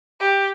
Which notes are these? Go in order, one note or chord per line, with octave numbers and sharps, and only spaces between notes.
G4